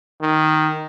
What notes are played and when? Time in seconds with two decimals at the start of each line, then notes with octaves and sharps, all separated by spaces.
0.21 D#3